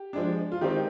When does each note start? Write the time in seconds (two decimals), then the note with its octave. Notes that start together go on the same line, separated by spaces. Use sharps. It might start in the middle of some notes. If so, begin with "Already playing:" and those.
Already playing: G4
0.13 F3 G#3 D4
0.52 F4
0.61 D#3 G#3 C4 D#4 G4